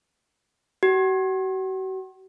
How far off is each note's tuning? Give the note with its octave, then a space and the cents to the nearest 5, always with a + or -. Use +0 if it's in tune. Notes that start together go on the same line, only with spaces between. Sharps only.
F#4 +40